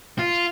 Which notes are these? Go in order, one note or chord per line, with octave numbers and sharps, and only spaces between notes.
F4